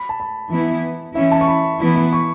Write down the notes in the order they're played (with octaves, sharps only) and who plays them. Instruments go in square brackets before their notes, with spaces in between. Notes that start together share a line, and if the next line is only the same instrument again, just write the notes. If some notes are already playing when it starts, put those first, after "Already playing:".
Already playing: [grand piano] B5
A5
B5
[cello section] E3 B3 E4
[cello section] E3 C#4 E4 [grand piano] E5
[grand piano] A5
C#6
B5
[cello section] E3 B3 E4 [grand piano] B5
[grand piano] B5
C#6